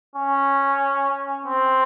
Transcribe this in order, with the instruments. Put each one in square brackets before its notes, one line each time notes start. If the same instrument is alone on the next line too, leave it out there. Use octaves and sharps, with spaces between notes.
[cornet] C#4
C4